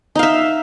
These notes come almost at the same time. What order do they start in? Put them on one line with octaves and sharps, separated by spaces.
D#4 F5 E5